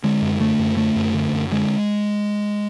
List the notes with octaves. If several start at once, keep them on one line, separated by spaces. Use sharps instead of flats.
D3 G#3
F#2
D3 A3
F#2
D3 A3
F#2
D3
F#2
D3 G#3